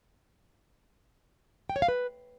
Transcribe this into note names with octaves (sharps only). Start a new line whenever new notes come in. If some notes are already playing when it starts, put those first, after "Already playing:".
G5
C#5
F5
B4